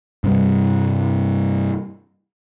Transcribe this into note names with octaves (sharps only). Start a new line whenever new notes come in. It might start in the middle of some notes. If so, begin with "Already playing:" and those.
G2 C3 G3